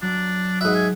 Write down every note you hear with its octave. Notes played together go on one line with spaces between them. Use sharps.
F#3 D4
G#2 F#4 B4 E5
G#5